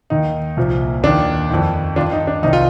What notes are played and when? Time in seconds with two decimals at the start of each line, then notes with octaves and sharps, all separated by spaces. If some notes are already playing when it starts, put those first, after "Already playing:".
0.10 D#2 D#3 D#4
0.57 C2 A#2 F3
1.03 D#2 D#3 D4
1.51 F2 D#3
1.96 D#3 D4 F4
2.00 G2
2.12 D#4
2.27 D4
2.43 C2 C3 D#3 D#4
2.53 F4